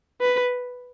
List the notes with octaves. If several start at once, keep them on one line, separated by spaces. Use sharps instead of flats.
B4